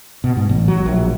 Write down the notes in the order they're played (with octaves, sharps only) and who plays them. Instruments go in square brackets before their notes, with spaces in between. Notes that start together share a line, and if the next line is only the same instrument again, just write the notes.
[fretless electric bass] B2
G#2
A1
F#3
A#1